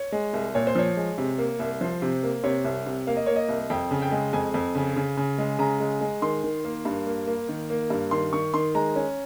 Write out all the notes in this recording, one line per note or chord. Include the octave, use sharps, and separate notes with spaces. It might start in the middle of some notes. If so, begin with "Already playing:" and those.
Already playing: C#5
G#3
C2
A#2 C#5
C5
F3 C#5
G#3
C3
A#3
C2
F3 C5
C3
A#3
C3 C#5
C2
C3
A#3 F5
D#5
A#3 C#5
D#5
C2
F2 G5
C#3
G5
G#3
F2 G#5
F2
C#3
C#3
C#3
G#3
C#3 A#5
G#3
G#3
D#3 C6
D#3
A#3
G2
A#3
A#3
D#3
A#3
G2
D#3 C6
D#3 C#6
D#3 C6
G#3 A#5
C#4